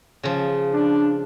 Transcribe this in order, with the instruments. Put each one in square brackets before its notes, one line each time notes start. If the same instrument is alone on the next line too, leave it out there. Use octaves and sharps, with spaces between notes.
[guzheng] C#3 F3
[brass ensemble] D4